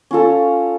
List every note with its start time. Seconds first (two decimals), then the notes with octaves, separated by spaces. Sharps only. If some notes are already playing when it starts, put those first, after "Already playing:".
0.11 C#4 F4 A4